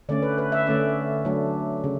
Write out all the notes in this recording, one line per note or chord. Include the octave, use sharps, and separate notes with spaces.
D3 A3 C#4 D5
B4
B4
E5
D3 A3 C#4 D5
F#3 A3 D4
C#3